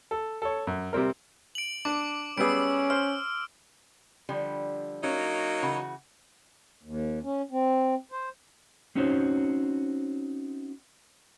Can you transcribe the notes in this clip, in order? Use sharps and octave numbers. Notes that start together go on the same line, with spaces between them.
A4
A4 C#5
F#2
C3 G3 C4 A#4
D7 F#7
D4 D6
G3 B3 C#4 G#4 E6 D7
C5 F6
D3 F3 G3
F#3 A#3 C#4 D#4 C#5
C#3 E3 F#4
D#2
C#4
C4
C5
C4 C#4 D#4 F#4 C5 C#5